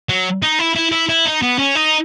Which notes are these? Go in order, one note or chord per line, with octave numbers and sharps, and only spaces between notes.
F#3
D#4
E4
E4
E4
E4
D#4
B3
C#4
D#4